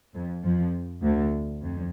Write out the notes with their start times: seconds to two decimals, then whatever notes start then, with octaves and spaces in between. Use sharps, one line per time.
0.15 F2
0.43 F2 F3
1.03 D2 D3
1.62 F2